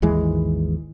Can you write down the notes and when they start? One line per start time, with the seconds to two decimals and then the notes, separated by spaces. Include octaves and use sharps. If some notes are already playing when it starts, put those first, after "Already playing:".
0.02 G#1 D#2 E3 G#3